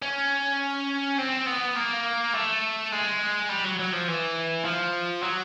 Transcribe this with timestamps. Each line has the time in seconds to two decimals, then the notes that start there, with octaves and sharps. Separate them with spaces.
0.02 C#4
1.18 C4
1.47 B3
1.76 A#3
2.34 A3
2.92 G#3
3.49 G3
3.64 F#3
3.79 F#3
3.93 F3
4.08 E3
4.65 F3
5.23 F#3